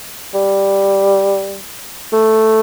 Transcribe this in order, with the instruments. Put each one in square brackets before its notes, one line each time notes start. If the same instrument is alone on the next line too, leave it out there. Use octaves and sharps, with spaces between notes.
[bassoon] G3
A3